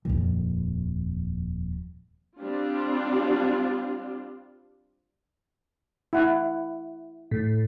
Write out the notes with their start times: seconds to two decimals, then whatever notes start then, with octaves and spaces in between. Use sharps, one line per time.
0.05 D#1 F2
2.40 G3 C4 D4 F4
6.13 E4 F#5
7.31 A2